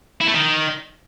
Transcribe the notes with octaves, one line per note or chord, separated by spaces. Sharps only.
E4
A3
D#3